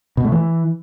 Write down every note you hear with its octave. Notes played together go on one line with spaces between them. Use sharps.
B2
A3
E3